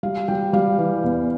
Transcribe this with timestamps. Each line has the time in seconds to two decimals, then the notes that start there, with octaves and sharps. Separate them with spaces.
0.03 G3 F5
0.28 G3 G5
0.53 G3 F5
0.78 E3
1.04 E2